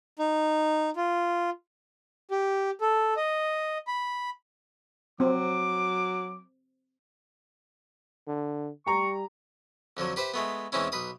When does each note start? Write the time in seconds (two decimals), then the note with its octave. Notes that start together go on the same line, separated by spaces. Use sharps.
0.19 D#4
0.96 F4
2.31 G4
2.81 A4
3.16 D#5
3.87 B5
5.20 F#3 C4 D6
8.27 D3
8.87 G3 G4 A#5 C#6
9.97 F2 D3 F3 F#3
10.16 G4 B4 C5 E5
10.34 G#3 A3 B3
10.72 E2 E3 G#3 C4 C#4 E4
10.92 B1 B4 D#6